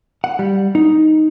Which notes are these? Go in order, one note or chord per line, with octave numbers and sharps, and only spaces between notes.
F#5
G3
D#4